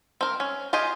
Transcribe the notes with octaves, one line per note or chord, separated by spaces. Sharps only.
C4 A#4
C#4
F4 G4 G#4 D#5